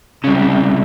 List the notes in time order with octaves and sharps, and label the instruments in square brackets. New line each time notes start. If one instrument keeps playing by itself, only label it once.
[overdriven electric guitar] C2 C#3